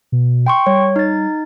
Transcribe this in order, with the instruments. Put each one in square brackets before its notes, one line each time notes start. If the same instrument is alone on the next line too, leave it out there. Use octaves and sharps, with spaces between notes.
[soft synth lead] B2
[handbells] G5 C6 C#6
[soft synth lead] G3 [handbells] C#5
[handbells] D#4 A6